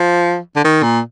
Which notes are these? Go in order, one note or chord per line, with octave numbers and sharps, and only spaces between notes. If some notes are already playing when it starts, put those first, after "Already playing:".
Already playing: F3
D3
D#3
A#2